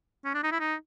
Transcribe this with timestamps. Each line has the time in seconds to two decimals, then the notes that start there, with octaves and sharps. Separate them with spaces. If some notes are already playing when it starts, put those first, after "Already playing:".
0.25 C#4
0.35 D4
0.44 D#4
0.52 E4
0.60 D#4